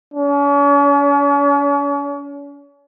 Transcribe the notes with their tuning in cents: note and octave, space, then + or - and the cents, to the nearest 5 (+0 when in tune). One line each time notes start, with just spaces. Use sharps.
C#4 +40